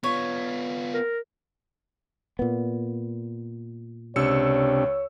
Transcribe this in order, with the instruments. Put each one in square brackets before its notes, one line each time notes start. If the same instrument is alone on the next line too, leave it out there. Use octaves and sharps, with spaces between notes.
[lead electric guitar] B3 F4 [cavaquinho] C#5
[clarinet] A#4
[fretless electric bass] A#2 B3
[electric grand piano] C#2 E6 C#7 [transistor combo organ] C3 D4 G4 [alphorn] C#5